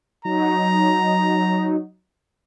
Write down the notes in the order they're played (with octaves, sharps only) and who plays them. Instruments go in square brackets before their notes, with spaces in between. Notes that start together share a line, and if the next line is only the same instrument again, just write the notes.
[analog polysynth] F#3 D#4 [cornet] A#5